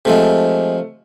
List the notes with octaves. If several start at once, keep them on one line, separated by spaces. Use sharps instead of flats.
C3 F3 G#3 A3